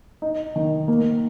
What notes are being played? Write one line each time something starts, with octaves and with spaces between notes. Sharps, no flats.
D#4
D#3
A#3